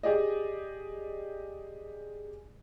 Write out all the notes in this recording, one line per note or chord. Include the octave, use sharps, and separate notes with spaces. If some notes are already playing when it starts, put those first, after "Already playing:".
G4 G#4 D5 D#5